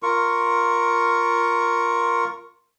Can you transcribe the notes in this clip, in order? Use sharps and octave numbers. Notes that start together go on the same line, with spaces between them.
F4 A#4 C#6